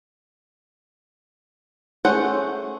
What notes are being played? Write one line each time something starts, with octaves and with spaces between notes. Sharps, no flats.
A3 C#4 G#4 C5 F#5